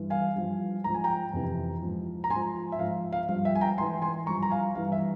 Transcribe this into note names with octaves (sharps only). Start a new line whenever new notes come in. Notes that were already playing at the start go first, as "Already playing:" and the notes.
Already playing: G2 E3
F5 G#5
G2 F3
G#2 F3 A#5
G#5
G5 A#5
F2 C3 E3
G#2 F3
A#5
G#2 G#5 C6
F3
E5
G#2 F3 F5
F5
G2 F3 F5
E5 G5
G#5
G5 A#5
G#2 E3 G#5 C6
G#5 C6
G2 F3 A#5 C#6
A#5
F5 G#5
G2 E3 F5
E5